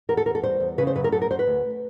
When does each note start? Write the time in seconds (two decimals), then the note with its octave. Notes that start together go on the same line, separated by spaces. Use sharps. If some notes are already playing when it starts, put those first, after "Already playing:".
0.09 E2 A#4
0.17 A4
0.26 E2 A#4
0.35 A4
0.43 G3 C5
0.60 E2
0.78 C#3 B4
0.87 C5
0.95 F#2 B4
1.04 A#4
1.12 F#2 A4
1.22 A#4
1.31 F#2 C5
1.39 B4
1.47 D2